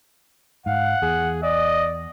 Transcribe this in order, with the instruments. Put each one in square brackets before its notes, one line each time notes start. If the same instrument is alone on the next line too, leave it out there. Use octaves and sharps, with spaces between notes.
[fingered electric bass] G#2 [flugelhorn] F5 [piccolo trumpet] F#5
[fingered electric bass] E2 [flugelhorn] G#4
[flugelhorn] D5 [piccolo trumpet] D#5